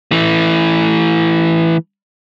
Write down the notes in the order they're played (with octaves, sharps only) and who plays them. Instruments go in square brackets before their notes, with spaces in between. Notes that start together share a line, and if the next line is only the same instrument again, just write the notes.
[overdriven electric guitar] E3 A3